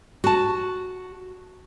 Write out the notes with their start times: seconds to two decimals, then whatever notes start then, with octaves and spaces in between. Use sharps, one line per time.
0.24 F#4 A5